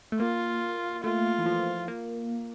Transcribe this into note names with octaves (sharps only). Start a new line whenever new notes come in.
A3
A#3 F4
A3 F4
E3
F3
A#3